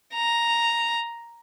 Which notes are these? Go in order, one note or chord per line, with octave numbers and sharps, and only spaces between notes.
A#5